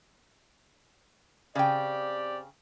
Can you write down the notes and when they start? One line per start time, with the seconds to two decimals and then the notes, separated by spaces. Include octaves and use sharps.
1.55 C#3 C4 G4 D5 G5